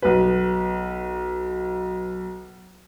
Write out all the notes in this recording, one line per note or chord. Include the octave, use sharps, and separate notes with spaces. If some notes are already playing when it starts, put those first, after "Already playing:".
B1 B4